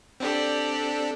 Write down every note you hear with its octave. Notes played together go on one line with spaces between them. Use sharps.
C4 D4 G4 A4 D5